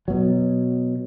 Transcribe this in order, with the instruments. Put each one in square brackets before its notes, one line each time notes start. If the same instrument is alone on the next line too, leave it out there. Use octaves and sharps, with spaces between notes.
[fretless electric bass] B2 F#3